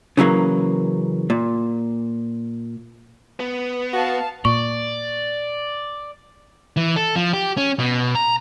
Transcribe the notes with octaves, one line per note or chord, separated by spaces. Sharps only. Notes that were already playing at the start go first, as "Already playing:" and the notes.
C#3 E3 F#3 A#3
A#2
B3
F#4 F5 A5
A#2 D5 C#6
E3
A4
F3
G4
C#4
B2
A#5